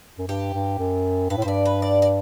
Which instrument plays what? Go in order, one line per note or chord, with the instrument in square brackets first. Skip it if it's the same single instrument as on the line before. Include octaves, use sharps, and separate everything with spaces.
[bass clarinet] F#2
[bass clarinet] G2 [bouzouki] G4
[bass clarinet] G2
F#2
[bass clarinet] G2 [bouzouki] B4
[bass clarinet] A2
[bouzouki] C5
[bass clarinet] G2 [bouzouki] D5
[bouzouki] B4
D5
D5